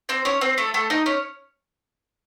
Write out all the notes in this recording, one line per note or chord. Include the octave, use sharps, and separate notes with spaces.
C4 C5
C#4 C#5
C4 C5
A3 A4
A3 A4
D#4 D#5
C#4 C#5